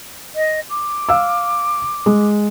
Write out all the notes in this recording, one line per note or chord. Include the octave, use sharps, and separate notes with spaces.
D#5
D6
F5 E6
G#3